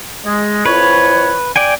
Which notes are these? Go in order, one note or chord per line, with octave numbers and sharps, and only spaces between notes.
G#3
F2 E4 B4 C#5
D5 G5 G#5